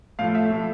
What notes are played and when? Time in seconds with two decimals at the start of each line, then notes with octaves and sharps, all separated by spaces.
0.19 A2 F3 A3 F5
0.35 E5
0.50 A2 F3 A3